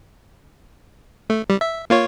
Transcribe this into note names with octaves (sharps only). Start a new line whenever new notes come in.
A3
G3
E5
A#3 F4 C#5